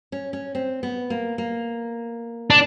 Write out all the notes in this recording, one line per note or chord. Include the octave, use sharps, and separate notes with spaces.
C#4
C#4
C4
B3
A#3
A#3
D4